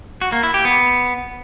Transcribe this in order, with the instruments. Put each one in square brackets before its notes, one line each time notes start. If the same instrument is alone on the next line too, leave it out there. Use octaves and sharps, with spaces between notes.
[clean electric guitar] F#4
A#3
E4
G4
B3